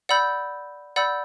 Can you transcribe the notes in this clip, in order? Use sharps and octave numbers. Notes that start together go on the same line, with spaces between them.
D5 F#5 B5 E6 G6
D5 F#5 B5 E6 G6